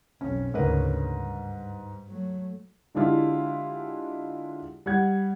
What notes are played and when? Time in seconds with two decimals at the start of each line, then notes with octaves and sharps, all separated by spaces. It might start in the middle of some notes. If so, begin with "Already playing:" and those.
0.21 B1 F2 C#4
0.54 D2 G#2 C#3 A#4 B4
1.11 G2
2.08 F#3 A3
2.95 D3 G#3 D4 E4 F4 G4
4.86 G3 F#5 G#6